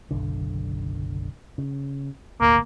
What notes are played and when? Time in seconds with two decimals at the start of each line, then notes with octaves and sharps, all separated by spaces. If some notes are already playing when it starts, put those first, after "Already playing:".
0.11 F#1 B1 D3
1.58 C#3
2.41 D#1 G#1 D2 A#3